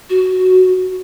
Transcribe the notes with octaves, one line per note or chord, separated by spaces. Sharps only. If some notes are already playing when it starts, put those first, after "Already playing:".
F#4